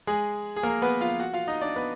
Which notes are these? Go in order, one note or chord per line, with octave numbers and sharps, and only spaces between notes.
G#3 G#4
G#4
A#3 A#4
B3 B4
F4 F5
F#4 F#5
F4 F5
D#4 D#5
D4 D5
B3 B4